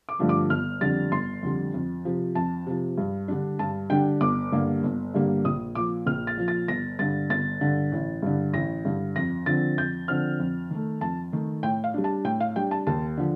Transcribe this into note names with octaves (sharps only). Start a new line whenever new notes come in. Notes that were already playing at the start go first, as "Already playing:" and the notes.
D6
G2 D3 F3 A3
D6
G1 F6
F2 D3 G3 A6
G1 C6
F2 D3 G3
F2
C3 F3
F2 A5
C3 F3
G2
D3 G3 D4
G2 A5
D3 G3 D4 G5
G1 D6
G2 D3 G3 A#3
G1
G2 D3 G3 A#3
A#1 D#6
A#2 F3 D6
A#1 F6
A6
A#2 F3
A6
G1 A#6
G2 D3 A6
G1 A6
G2 D3
A1
G2 D3
A1 A#6
G2 D3
F2 A#6
D3 F3 C4 A6
F2 G6
D3 F3 C4 F6
F2
D#3 A3
F2 A5
D#3 A3
A2 G5
F5
G3 D4
A5
A2 G5
F5
G3 D4 G5
A5
D#2 A5
D3 F3